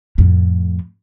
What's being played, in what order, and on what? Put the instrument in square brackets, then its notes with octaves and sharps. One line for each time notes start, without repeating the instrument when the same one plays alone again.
[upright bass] F2 A2